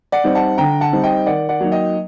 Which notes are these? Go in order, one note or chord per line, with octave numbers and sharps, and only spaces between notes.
D5 F#5
G3 C4 D#4
F#5 A5
D3 G5 A#5
F#5 A5
G3 C4 D#4
D#5 G5
D#3 D5 F#5
D5 F#5
F#3 A#3 D#4
D#5 G5